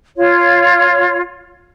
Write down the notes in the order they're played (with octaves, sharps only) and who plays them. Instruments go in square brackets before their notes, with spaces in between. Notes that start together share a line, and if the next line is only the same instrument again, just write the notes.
[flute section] F4 C#5